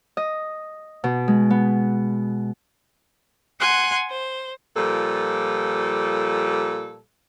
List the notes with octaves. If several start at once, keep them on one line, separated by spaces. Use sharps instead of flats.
D#5
B2
G#3
B3
F#5 G#5 C6 F#6
C5
A#2 F3 G3 A4